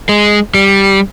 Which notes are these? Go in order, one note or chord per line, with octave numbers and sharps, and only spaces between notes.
G#3
G3